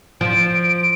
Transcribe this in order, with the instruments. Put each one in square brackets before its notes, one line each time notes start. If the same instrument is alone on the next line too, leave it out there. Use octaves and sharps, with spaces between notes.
[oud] F3 [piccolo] D7